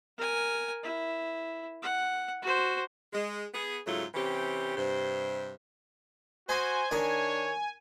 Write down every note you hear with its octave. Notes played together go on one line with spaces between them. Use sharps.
A#4 G#5
E4
F#5
F#4 C5
G#3
B3 G#4
G#2 C#3 F#3 A3 E4 F4
C3 E3 C4 C#4 G4
G2 C3 C5
F#4 C5 D#5 G#5 C6
D#3 D4 C#5 D#5 D#6